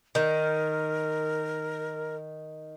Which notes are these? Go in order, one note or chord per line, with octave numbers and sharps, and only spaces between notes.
D#3 A#4